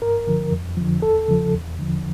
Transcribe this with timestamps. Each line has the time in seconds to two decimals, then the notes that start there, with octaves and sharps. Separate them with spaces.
0.02 G2 A#4
0.27 D3 F3
0.52 F2
0.77 D3 F3
1.02 E2 A4
1.28 C#3 F3
1.53 E2
1.78 D3 F3